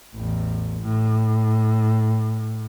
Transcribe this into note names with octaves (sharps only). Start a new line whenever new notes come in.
A1 E2
A2